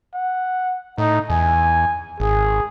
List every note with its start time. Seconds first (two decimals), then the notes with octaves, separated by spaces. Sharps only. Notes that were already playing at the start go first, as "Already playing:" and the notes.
0.14 F#5
0.98 A2 D#4
1.30 E2 G#5
2.20 G#1 G#4